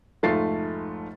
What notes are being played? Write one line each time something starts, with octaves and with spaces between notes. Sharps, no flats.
F1 G#2 A3 F4 A6 C7